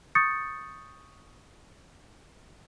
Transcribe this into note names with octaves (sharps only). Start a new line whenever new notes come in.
C#6 D#6 G6 A6 C#7